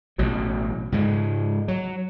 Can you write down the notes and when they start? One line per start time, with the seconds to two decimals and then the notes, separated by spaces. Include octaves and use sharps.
0.18 A1 B2 F#3
0.92 G#2 C#3 G#3
1.68 F#3